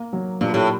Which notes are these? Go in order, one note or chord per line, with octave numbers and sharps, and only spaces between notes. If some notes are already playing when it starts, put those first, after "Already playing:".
Already playing: A#3
F#3
G2 A#2
A2